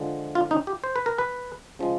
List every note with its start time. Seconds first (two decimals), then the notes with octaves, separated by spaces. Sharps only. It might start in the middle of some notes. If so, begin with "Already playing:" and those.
Already playing: D3 F3 G#3
0.35 F4
0.51 D#4
0.67 G4
0.84 C5
0.96 B4
1.06 A#4
1.18 B4
1.79 C#3 F3 G#3